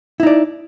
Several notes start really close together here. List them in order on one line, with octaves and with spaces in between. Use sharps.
E4 D#4 D5